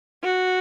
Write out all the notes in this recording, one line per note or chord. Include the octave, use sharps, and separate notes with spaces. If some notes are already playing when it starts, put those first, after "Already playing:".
F#4